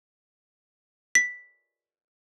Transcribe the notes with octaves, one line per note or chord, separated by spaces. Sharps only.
B6